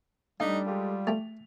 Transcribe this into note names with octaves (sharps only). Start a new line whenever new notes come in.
G3 A3 D4 D#4 F5 B6
G#3 F4 G4 A4
A3 G4 F7